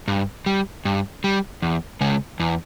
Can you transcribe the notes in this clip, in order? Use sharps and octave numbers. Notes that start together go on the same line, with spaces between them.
G2
G3
G2
G3
E2
C#3 G#3
E2